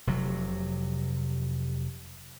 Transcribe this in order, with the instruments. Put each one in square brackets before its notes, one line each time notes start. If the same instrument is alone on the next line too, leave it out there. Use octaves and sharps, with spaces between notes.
[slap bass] F1 C3 F#3